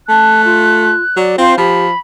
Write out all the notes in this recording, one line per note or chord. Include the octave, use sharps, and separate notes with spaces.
A3 A5 F#6
F4
F#3 D5
C4 F4 C5 F5 C6
F3 G4 B5